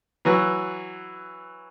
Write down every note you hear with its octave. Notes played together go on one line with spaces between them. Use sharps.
E3 F#3